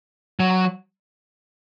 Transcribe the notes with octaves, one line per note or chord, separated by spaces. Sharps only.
F#3